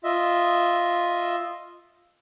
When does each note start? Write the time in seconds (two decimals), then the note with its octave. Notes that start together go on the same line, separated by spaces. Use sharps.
0.04 F4 D#5 E5